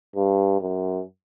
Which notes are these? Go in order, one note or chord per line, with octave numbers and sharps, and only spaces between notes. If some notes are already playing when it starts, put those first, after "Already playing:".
G2
F#2